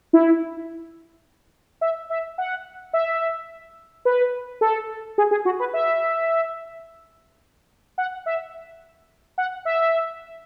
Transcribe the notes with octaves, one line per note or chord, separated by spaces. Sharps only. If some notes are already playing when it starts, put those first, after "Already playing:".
E4
E5
E5
F#5
E5
B4
A4
G#4
G#4
F#4
B4
E5
F#5
E5
F#5
E5